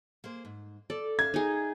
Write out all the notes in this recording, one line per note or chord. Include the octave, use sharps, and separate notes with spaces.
A#3 G#4 C5
G#2
A4 D5
E5 F5 G#6
D#4 G#4